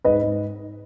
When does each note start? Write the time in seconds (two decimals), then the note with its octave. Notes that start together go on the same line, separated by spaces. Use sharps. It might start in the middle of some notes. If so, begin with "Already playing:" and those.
0.04 G#2 B4 D#5
0.23 G#2